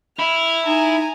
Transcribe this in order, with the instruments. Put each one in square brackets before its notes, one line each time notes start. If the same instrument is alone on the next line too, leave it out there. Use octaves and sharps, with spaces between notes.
[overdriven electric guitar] E4 [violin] F6
[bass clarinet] D#4 [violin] G#5 A#5